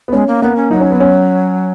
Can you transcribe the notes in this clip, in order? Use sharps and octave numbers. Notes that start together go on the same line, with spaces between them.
B3
G#3 C#4
A#3
A#3 B3
C#4
F#3 D#4
C#4
B3
C#4